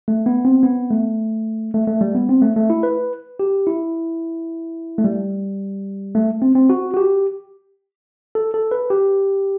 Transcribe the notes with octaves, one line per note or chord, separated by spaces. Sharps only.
A3
B3
C4
B3
A3
A3
A3
G3
B3
C4
A3
A3
E4
B4
G4
E4
A3
G3
A3
C4
C4
F#4
F#4
G4
A4
A4
B4
G4